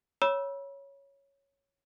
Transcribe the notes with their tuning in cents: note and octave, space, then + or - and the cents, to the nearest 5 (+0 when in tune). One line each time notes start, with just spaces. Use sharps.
C#5 +0 B5 -35 E6 +0